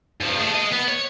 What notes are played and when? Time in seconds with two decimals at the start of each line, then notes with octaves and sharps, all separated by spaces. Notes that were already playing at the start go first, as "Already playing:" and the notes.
0.21 G2 F3
0.37 A3 G#4
0.54 G#4 D#5
0.72 B3
0.88 C#5